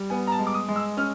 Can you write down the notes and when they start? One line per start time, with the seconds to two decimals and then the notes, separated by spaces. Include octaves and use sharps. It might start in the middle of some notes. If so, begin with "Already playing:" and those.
Already playing: G3
0.10 B3 G#5
0.27 A#5
0.32 A5
0.39 G#3
0.47 D6
0.54 D#6
0.69 G#3
0.76 E6
0.97 C#4 F6